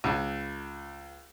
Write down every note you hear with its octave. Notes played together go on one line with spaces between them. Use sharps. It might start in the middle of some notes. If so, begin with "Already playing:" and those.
C#2